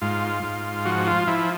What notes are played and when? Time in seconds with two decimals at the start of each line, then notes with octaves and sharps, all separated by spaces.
0.02 G#2 F4
0.43 G#2
0.85 F3 F#4
1.07 F4
1.27 F3 E4